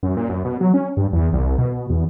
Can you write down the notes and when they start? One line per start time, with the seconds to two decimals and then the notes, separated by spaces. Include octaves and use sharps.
0.03 F#2
0.17 A#2
0.29 F#2
0.45 B2
0.61 F#3
0.74 C#4
0.97 G2
1.13 E2
1.33 C2
1.58 B2
1.90 E2